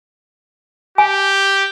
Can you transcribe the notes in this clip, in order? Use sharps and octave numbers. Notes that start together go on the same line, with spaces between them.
G4 G#5